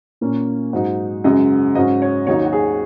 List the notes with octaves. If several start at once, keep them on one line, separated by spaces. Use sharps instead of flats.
A#2 A#3 C#4
G#2 F#3 D#4
F#2 C#3 G#3 D#5
G#2 F#3 C#4 D#5
C#5
D#2 D#3 F#3 D#4 C#5
F#4
G#4